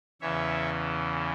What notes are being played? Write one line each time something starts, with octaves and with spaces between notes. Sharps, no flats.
E2 C#3 E3 C#5 E5